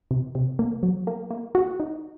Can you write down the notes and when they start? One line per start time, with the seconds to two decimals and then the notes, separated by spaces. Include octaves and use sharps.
0.11 C3
0.35 C3
0.59 A#3
0.83 F#3
1.07 A#3
1.31 A#3
1.55 F#4
1.80 D#4